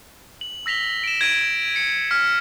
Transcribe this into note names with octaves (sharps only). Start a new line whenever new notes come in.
F#7
E6 A#6 B6 F7 G7
D7 E7
G#6 A#6 D7 D#7 F#7
C#7
F6 B6